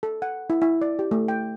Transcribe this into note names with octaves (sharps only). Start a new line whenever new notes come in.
A4
F#5
E4
E4
D5
G4
A3
G5